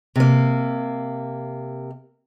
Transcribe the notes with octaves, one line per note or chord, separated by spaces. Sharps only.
C3 A#3